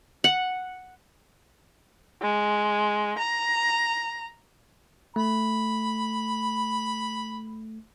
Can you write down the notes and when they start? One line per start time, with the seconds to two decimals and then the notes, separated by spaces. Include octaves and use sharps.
0.24 F#5
2.22 G#3
3.18 A#5
5.16 A3 B5